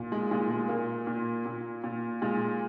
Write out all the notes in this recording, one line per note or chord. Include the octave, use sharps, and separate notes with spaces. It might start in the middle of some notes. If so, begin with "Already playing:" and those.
Already playing: A#2
G#3
A#2 G#3
G#3
A#2 A#3
A#2
A#2
A#2
A#2 G#3